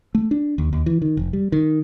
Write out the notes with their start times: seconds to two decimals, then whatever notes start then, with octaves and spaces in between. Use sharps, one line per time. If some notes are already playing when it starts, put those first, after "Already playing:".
0.15 A3
0.31 D4
0.58 D#2
0.73 D#2
0.86 E3
1.02 D#3
1.17 F1
1.33 G3
1.52 D#3